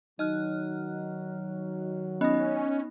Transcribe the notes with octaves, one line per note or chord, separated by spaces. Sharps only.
D#3 F#3 D#4 D#5 F6 F#6
B3 C#4 D#4 D#5